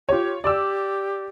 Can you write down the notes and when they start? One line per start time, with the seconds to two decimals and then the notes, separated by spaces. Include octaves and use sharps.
0.09 F4 G4 C#5
0.44 G4 D5 D6 E6